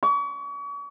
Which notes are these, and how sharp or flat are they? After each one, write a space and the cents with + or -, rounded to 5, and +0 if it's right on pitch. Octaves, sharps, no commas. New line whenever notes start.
C#6 +40